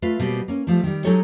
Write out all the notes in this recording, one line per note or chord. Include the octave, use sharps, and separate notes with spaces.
A3 F4 B4 F5
B2 G3 A#3 C4
A#3 C#4
F3 G3 A3
D#3 G3
F#3 G#3 D#4 G4 A4 C#5